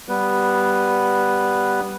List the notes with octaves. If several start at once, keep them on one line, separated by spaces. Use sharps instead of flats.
G3 B3 B4